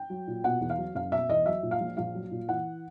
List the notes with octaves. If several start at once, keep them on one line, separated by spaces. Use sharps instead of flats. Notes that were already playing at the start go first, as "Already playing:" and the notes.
Already playing: G5
F#3
A#2
B2 F#5
E2
F5
F#3
F#1 F5
B2 E5
E2 D#5
F#3 E5
A#2
F5
A#1
A#1 F5
F#3
A#2
E3 F#5